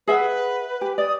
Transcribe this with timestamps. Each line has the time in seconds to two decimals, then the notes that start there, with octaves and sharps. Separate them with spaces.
0.08 G#4 B4 E5 F#5
0.81 G4
0.98 D5 D#6